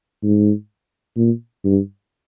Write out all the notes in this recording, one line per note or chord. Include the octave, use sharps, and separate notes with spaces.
G#2
A#2
G2